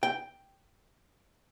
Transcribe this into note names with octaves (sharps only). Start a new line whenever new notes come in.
G5